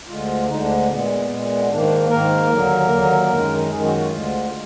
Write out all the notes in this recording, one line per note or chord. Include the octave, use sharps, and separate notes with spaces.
D2 D3 G#3 F4
D4
D2 D3 G#3 D#4
D4
A#2 G#3 B3
A#2 G#3
G#2 D#3 A#3 D4
D4
G#2 D#3 A#3 A#4
D#2 D3 F#3 A#3
D#2 D3 F#3 A#3
F#2 D#3 G#3
F#2 D#3 G#3 G#4
F#4
F4
D2 D3 G#3
G#3